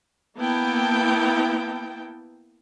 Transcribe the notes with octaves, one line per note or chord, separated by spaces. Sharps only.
A#3 B3 E4 G5 A5